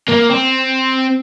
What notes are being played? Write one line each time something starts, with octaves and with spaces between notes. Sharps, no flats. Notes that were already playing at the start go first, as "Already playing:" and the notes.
A#3
C4